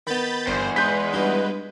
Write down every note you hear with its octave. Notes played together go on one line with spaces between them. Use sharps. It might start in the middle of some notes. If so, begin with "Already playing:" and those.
D#3 B3 B5 G6 A6
G1 E2 C5
G#3 D#4 B4 C6 G6 B6
G2 D#4 F#4